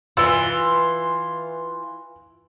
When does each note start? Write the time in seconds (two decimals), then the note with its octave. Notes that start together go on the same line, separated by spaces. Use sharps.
0.17 E3 F4 E6